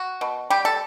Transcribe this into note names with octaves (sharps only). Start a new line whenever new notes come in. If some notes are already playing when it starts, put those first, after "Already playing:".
Already playing: F#4
B2
G3 G4
A4